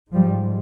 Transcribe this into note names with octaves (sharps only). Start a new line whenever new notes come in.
G#2 F3 G3